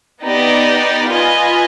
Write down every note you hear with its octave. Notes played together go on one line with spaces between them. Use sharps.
B3 D#4 G4 D5
F4 B4 D#5 G#5